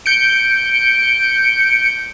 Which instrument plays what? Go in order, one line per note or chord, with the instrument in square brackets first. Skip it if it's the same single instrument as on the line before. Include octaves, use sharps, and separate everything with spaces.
[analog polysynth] G6 C#7 D7